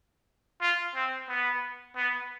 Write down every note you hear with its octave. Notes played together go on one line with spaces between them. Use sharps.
F4
C4
B3
B3